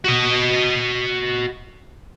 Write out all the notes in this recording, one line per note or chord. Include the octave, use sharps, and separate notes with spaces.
F#4 D#5